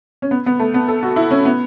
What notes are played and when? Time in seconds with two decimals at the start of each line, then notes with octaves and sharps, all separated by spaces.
0.22 C#4
0.31 B3
0.46 B3
0.59 A3
0.74 B3
0.88 A4
1.03 F#4
1.16 E4
1.31 C#4
1.45 B3